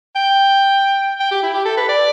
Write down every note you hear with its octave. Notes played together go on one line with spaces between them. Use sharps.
G5
G5
G4
E4
G4
A4
B4
D5